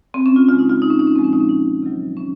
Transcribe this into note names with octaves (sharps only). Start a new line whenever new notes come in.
C4
C#4
F4
C#3 G#3 F4
D#4
F4
D#4
C#4
D#4
C#4
A#2 F3 G#3 C4
C#4
D#4
C#4
D#4
C3 D#3 F#3
C#4